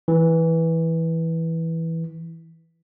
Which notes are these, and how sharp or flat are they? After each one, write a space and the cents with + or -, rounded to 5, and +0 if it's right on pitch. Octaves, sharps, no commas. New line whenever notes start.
E3 -10